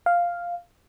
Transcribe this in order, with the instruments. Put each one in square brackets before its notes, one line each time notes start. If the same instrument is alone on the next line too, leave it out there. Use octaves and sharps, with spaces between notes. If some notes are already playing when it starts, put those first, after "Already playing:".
[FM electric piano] F5